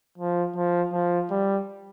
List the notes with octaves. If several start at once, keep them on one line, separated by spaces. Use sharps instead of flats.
F3
F3
F3
G3